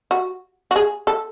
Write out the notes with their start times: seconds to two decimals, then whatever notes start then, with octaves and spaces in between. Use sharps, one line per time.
0.11 F#4
0.71 F#4
0.76 G#4
1.07 A4